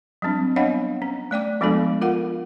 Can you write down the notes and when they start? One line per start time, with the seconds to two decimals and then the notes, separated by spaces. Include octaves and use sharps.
0.22 F#3 G3 C4 D4
0.56 B3 D4 C#5 D#5 F5 F#5
1.02 C#4
1.31 A3 D5 G5 D6
1.61 F3 G#3 B3 D4 F#4 A4
2.02 F4 A#4 F5 F#5